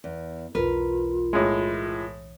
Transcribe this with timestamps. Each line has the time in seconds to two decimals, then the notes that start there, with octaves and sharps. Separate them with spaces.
0.04 E2
0.55 B1 E2 F4 A#4 B4
1.33 A2 G#3